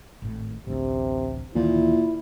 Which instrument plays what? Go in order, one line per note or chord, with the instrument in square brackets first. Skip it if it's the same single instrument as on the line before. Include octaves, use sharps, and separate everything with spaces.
[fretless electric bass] G#1 A2
[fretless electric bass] A1 D2 [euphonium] C3
[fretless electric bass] D2 D#3 E3 [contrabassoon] A#2 [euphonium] E4